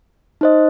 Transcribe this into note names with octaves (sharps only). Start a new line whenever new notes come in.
D#4 C5 D#5